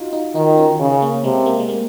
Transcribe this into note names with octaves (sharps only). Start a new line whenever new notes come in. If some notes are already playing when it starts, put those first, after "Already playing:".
Already playing: D#4 F4 F#4
D#4
D#3 D#4
C#4
C#3
A#3
C3 G#3
A#3
G#3
A#3